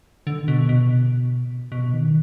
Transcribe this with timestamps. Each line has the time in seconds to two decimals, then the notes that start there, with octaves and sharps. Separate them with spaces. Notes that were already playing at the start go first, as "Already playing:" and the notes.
0.27 D3
0.48 B2
0.69 B2
1.72 B2
1.93 D#3